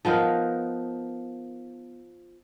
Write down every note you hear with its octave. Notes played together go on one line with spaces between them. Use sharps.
F3 B3 D#4 A#4